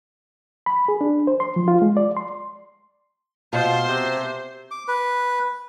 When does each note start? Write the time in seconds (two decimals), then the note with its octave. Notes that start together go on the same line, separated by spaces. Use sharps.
0.66 B5
0.88 G#4
1.01 D4
1.27 C5
1.40 C6
1.56 F3
1.68 F4
1.82 G#3
1.97 D5
2.17 C6
3.53 B2 F4 C5 C6
3.89 C3
4.71 D6
4.88 B4